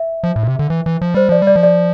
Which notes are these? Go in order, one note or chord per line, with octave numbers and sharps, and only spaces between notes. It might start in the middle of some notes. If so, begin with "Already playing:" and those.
Already playing: E5
F3
A2
A#2
C3
D3
E3
E3
F3
G3 C5
F3 D5
G3 D5
F3
D5